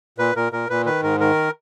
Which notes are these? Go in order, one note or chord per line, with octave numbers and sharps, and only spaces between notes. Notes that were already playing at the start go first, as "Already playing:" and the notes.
A#2 B4
A#2 A#4
A#2 A#4
A#2 B4
D#3 B4
G#2 A#4
D#3 A#4